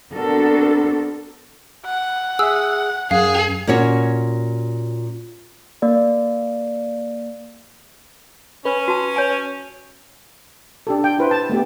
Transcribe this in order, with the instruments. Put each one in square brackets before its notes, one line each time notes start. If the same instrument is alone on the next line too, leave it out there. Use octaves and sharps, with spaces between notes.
[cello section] B3 C4 D4 F#4 A4 A#4
[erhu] F#5
[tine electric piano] G#4 E5 [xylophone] E6
[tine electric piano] F#2 [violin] G#4 [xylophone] F5
[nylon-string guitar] A#2 C#4 F#4 C#5
[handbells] A#3 D5
[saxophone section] C#4 [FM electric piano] B4
[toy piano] F#4 A5
C#5 G#5
[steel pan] D4 G4 A4
G5
E4 B4 C5
A5
A3 B3 G4